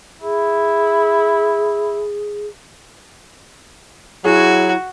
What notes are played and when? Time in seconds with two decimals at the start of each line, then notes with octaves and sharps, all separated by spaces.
0.22 E4 G#4
4.25 F#3 E4 F#4 G#4